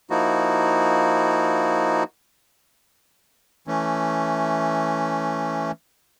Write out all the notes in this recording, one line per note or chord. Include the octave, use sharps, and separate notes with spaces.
F3 A#3 D#4 E4 F#4
E3 A3 C#4